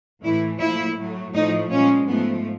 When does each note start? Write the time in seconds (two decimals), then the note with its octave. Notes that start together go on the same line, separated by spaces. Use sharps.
0.23 A2 E3 A3 E4
0.60 A#2 F3 A3 E4
0.97 A2 F#3 A3
1.34 A2 F3 A3 D#4
1.70 A#2 F3 G#3 C#4
2.07 G#2 F3 A3 B3